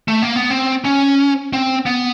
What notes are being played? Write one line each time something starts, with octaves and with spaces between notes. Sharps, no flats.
A3
A#3
B3
C4
C#4
C4
B3